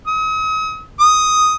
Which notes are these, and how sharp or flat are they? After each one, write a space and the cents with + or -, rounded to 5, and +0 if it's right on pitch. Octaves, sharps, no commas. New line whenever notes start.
D#6 +40
D#6 +5